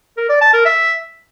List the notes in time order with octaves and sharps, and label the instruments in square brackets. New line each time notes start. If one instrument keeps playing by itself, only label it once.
[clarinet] A#4
D5
A5
A#4
E5